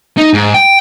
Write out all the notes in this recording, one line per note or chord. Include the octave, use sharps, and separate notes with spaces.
D#4
G#2
G5